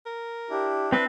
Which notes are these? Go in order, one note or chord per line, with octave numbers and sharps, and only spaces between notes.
A#4
D4 E4 G4
C4 B4